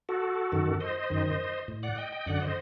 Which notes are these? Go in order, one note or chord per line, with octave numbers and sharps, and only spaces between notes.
F#4 A4
F#2 D#3
C5 D#5
F#2 D#3
A2
D5 F#5
D#5 G5
D#5 G5
F#2 D3 D5 F#5
C5 D#5